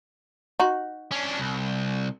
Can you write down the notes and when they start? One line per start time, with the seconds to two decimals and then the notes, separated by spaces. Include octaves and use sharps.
0.60 D#4 F#4
1.11 C#4 D4
1.38 C2